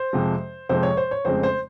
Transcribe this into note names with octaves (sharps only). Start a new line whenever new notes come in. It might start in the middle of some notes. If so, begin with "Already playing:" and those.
Already playing: C5
F2 C3 F3 G#3
F2 C3 F3 G#3 C5
C#5
C5
C#5
F1 F2 C#3 G#3 C4 C5
C5